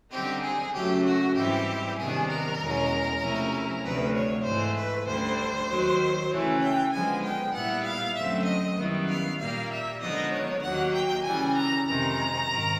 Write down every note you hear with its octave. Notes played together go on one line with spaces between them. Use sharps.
D3 G3 C4 D#4 G4
G#4
F#2 C#3 F#3 A3 G4
F#4
G#2 E3 G3 C4 E4 G4
C3 D#3 G3 B3 D4 G#4
A#4
E2 B2 G#3 C#4
C3 F3 A3 C#4 E4
D2 C3 F3 A3 B4
C#5
G#2 E3 A3 C5
B4
D2 D3 G3 C5
D#2 D#3 F#3
C#3 E3 A3 C#5
G5
D3 F3 G#3 B3 G#5
G5
A#2 G3 B3 E4 F#5
F5
F#2 D3 F#3 A3 C4 E5
D#5
F#2 D#3 G3 B3 E4
F5
A#2 G3 A#3 F5
E5
D3 F3 G#3 B3 D#4 D#5
C#5
D#2 D#3 F#3 A#3 F#5
G5
C#3 E3 G3 G#5
A#5
F2 C3 D#3 G#3 A#5
G#2 D#3